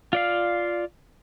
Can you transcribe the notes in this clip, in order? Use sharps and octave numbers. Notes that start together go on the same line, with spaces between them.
F4 D5 F5